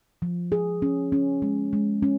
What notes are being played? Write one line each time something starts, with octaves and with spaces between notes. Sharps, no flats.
F3
G#4
C#4
C#4
G#3
G#3
C#4